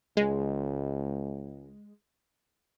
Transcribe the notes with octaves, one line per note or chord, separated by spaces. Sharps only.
C#2 G#3